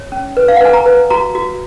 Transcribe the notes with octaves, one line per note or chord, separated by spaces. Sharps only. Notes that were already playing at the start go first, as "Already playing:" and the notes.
Already playing: C#5
C#4
B4
F5
F#5
B4 G#5
A#5
B4
F#4 A#5
F#4